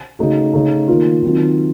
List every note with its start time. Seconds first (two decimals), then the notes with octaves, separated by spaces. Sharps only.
0.19 C#3 A3 D#4 F#4
0.53 C#3 A3 D#4
0.88 D#3 A#3 F4
1.22 D#3 F#3 C4 F4